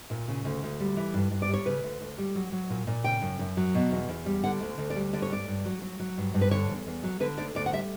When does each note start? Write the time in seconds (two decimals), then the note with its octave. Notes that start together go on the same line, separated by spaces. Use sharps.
0.10 A#2
0.28 C#3
0.45 D2
0.63 D2
0.80 G3
0.97 E3
1.14 G2
1.31 G2
1.42 D5
1.49 G3 C#5
1.66 C#3 B4
1.83 D2
2.01 D2
2.18 G3
2.35 F#3
2.52 F#3
2.70 A#2
2.87 A#2
3.04 C#3 G5
3.22 F#2
3.39 F#2
3.57 F#3
3.75 B2
3.91 E2
4.09 E2
4.26 G3
4.44 D3 F#5
4.60 D2
4.78 D2
4.90 D5
4.96 G3
5.13 D3 D5
5.22 C#5
5.30 G2 D5
5.48 G2
5.65 F#3
5.82 F#3
6.00 F#3
6.17 G2
6.34 G2
6.41 B4
6.51 D3 C#5
6.69 E2
6.87 E2
7.04 F#3
7.20 D3 B4
7.37 D2 D5
7.55 D2 D5
7.66 F#5
7.73 G3 E5